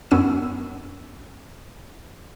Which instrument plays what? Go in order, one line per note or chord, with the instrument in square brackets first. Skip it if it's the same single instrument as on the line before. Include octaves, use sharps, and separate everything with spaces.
[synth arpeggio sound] F#2 B3 C#4 E6 D#7